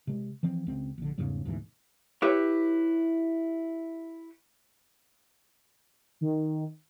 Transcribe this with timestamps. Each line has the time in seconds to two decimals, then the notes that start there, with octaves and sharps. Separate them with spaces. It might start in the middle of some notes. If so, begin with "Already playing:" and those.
0.07 C3 G#3
0.43 E3 F3 C4
0.67 C#2 C4
0.98 A#1 D3
1.18 E2 G#2 C#3 G3
1.45 D2 G#2 B2 E3
2.22 E4 G4 B4 C#5 E5
6.21 D#3